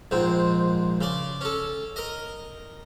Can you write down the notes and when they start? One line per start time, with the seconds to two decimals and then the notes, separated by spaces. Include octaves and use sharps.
0.11 A#1 G#2 C4
1.01 C#3 D5
1.41 C#4 A4
1.96 A#4 D#5